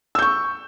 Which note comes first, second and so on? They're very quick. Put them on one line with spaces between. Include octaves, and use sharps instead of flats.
E6 G6 C#6